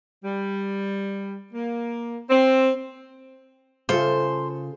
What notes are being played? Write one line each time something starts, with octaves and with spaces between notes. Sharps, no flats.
G3
A#3
C4
C#3 F4 A4 C5